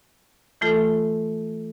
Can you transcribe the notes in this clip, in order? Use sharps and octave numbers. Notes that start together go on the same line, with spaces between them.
E3 A3 F4 A4